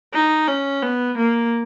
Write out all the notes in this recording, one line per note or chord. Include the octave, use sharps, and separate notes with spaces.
D#4
C#4
B3
A#3